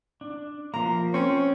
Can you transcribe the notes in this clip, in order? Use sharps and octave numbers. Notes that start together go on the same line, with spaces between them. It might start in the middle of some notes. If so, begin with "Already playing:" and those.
D4
F3 A#3 A#5
C4 C#4 C#6